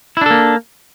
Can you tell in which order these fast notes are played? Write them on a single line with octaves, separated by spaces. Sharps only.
E4 D4 A4 A#3